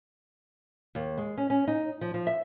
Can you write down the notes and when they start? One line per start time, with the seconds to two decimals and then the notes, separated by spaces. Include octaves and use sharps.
0.95 D#2
1.18 G#3
1.38 C#4
1.50 C#4
1.68 D#4
2.01 F3
2.14 F3
2.27 E5